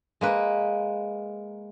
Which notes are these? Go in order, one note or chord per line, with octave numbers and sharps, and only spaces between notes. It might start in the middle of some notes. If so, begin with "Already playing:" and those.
G#3 A#3 B4